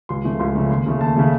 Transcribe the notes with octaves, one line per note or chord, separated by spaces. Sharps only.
C#2 C6
C#3 F3 A3
C#2 C6
C#3 F3 A3
D#2 C6
C#3 A3
D#2 A5
C#3 A3